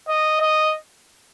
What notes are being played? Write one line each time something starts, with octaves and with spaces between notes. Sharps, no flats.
D#5
D#5